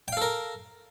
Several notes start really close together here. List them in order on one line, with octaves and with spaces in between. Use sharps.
G5 F5 A4 A#4